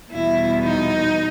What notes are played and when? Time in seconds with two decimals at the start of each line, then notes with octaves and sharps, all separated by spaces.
0.12 E2 B2 G3 E4
0.63 D#4